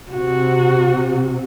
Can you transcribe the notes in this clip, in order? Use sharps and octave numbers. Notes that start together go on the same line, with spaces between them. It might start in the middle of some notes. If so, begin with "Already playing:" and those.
C3 F#4